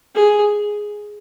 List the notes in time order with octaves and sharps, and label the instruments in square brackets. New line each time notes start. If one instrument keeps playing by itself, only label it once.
[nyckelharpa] G#4